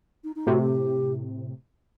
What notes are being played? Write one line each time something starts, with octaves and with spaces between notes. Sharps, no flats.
D#4
D#4
A2 C3 F#4
G4